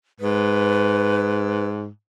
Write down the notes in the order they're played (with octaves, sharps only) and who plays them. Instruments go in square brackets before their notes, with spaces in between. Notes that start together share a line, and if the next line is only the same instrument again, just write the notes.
[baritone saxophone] G#2 [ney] B4